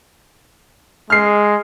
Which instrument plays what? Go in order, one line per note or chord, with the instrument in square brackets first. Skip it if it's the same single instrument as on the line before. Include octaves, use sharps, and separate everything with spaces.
[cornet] G#3 [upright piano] F6 C7